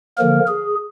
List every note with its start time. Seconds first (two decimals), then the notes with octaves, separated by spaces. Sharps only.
0.18 D3 F3 A#3 A#4
0.48 G#4